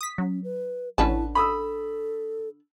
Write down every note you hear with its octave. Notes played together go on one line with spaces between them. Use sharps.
D#6 B6
F#3 C#4
B4
A1 D3 C#4 E4 B4 A5
A4 B5 D#6 E6